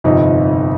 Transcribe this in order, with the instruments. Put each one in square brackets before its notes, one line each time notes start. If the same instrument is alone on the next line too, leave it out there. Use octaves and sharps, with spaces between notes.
[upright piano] G1 F2 C3 D#4